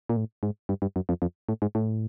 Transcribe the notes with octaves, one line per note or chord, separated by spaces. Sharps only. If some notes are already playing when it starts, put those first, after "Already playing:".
A#2
A2
G#2
G2
G2
F#2
F2
F2
A2
G#2
A2